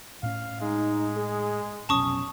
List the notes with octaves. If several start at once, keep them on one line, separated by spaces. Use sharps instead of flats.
A2 C#4 F5
G#3 D#4
G#4
F1 B1 C#4 A5 C#6 D#6